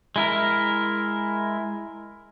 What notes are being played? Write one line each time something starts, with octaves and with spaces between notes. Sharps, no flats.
G#3 E4 A#4